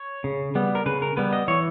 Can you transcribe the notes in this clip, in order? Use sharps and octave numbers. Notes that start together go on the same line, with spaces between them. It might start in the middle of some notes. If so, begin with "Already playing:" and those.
Already playing: C#5
C#3
G3 B3
A#4
C#3 B4
A#4
G3 B3 B4
D#5
E3 C#5